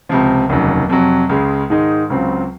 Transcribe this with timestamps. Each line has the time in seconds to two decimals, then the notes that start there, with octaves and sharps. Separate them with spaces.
0.09 C#2 C3 F3
0.49 F1 D#2 C#3 F#3
0.89 F2 C3 F#3
1.29 C#2 C#3 G#3
1.70 G#2 D#3 G#3 D#4
2.10 C#2 C#3 F#3 C4 F4